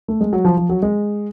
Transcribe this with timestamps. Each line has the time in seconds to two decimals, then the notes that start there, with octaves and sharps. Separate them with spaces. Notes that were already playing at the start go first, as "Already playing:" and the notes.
0.08 A3
0.21 G#3
0.33 F#3
0.45 F3
0.57 F3
0.69 F#3
0.82 G#3